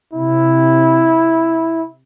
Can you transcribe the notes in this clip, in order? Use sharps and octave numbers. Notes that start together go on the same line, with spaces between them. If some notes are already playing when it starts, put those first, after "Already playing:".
C3 E4